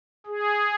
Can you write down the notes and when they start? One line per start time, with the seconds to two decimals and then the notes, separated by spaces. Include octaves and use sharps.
0.26 G#4